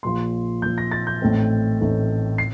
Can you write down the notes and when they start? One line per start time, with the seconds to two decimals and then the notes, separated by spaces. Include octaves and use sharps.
0.03 A#1 A#2 F3 C6
0.62 A#1 A#2 F3 G6
0.78 A#6
0.92 A6
1.07 G6
1.21 A1 A2 A3 C4 D#4
1.81 A1 A2 A3 C4 D#4
2.38 C7